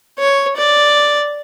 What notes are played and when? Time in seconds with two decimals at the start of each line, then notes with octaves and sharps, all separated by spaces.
0.19 C#5
0.57 D5